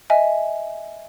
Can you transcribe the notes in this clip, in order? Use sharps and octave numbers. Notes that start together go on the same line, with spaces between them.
D#5 E5 G#5